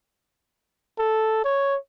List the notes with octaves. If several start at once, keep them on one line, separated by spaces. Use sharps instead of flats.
A4
C#5